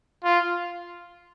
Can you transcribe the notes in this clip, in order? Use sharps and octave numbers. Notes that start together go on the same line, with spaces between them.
F4